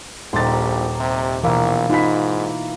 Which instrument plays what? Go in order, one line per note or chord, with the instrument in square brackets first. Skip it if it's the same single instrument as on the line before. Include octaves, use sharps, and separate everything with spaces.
[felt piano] D#1 A6 [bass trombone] A#1 [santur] D#4 G4 C6
[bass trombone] C3
[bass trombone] A#1 [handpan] B2 E3 [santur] A#3 E4 B4
[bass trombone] G#2 [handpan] D#4 [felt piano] F4 B5 B6